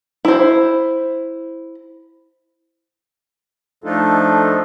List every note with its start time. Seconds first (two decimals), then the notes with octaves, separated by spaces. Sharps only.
0.25 E4 C5
3.84 F3 A3 D4 D#4 F4 A4